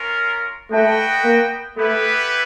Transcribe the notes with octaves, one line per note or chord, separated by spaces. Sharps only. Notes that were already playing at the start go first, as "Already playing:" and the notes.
Already playing: C#4 F4 A#4
A3 F#4 B4 D#5 G5
A#3
A3 B3 E4 G4 B4